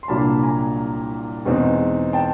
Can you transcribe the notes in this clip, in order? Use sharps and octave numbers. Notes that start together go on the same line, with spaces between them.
C6
C2 A#2 F#3 A#3 D4 A5 B5
G#5 A#5
E2 B2 G#3 C4 D#4
G5 A5